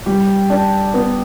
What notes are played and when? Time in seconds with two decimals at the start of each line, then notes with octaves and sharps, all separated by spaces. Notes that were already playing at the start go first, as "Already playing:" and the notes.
0.06 G3 G4
0.50 D4 D5
0.94 B3 B4